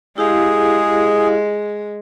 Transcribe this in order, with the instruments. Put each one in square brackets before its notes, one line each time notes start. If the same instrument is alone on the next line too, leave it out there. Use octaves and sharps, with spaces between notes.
[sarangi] G#3 [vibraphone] E4 G4 F5 [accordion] G#4